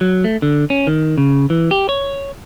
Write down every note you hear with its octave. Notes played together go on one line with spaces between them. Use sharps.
F#3
A3
D3
C#4
D#3
C#3
E3
G4
C#5